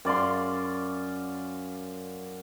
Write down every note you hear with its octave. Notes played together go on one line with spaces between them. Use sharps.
F#2 D5 F5 C6